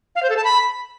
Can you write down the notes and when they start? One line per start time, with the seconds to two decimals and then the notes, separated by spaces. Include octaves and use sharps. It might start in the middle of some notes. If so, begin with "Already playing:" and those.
0.16 F5
0.23 C5
0.30 A4
0.37 A5
0.44 B5